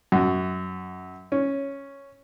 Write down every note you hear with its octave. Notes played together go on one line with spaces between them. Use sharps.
F#2
C#4